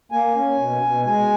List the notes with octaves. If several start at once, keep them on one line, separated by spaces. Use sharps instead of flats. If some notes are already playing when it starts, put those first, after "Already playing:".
A#3 G#5
C#4
B2
B2
G#3 G#5